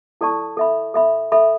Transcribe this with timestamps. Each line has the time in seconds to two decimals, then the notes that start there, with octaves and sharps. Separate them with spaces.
0.21 E4 A4 D5 A5 C#6
0.57 A4 E5 B5
0.94 A4 E5 B5
1.32 A4 E5 B5